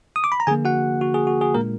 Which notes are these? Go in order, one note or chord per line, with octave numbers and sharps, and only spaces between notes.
D#6
D6
B5
A#5
D3 F3 A#3 G#4 G#5
F#4 F#5
F#4
G#4
F#4
G#4
A#2 G#3 A#3 D4 F4 A#4